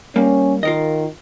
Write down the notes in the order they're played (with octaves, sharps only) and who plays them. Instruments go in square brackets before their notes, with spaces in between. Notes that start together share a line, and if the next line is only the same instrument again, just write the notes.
[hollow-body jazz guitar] G3 A#3 [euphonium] C#4
[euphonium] D#3 [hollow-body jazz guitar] F4 A#4 D#5